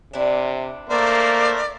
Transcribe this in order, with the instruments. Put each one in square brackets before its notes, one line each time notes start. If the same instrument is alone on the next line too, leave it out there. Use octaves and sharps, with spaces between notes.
[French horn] C3 [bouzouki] D4 E4
[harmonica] A3 A#4 C5 [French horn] A#3 [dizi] D5